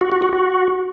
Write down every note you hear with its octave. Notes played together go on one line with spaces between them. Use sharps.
F#4
F#4
F#4
F#4